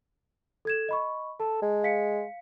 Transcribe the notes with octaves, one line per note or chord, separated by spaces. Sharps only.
A4 G#6 E7
D#5 B5 C#6
A4 A5
G#3
F5 B6 C#7